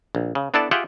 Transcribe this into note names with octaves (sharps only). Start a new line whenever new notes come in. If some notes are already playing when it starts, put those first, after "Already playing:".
A#1
C#3
B3 D4 E4 A4 D5 A5
F4 G4 G#4 E5 F#5 G5